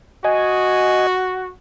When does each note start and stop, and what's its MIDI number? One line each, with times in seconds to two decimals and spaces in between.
0.25 1.50 66
0.25 1.07 75
0.25 1.07 80